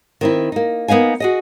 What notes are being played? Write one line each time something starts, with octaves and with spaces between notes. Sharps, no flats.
D#3 C4 E4
A#3 D#4
A#3 B3 D#4 F5 G#5
F#4 G#4 D#5